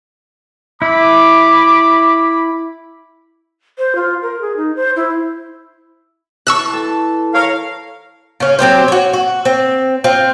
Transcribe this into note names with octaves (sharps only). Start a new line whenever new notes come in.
E4 B5 D6
C5
F4
A#4
G#4
D#4
C5
E4
E3 A5 C#6 E6 F#6
A4 A5
A#4 C#5 F5
C#3 C#4
F#3 C4 G4 C5
F#4 C#5
F#4
C4
C4 F4